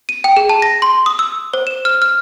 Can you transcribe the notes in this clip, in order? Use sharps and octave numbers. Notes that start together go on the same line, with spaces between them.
D#7
G5
G#4
A5
A#6
C6
D#6
E6
C5
E7
F6
F6